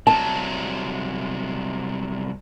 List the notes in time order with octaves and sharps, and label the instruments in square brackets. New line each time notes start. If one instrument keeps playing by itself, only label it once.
[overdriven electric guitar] C2 F#3 [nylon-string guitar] A5